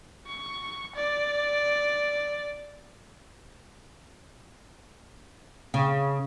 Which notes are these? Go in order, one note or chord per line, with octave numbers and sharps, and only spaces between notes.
C#6
D5
C#3